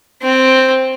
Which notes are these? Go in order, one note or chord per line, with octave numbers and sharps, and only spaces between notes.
C4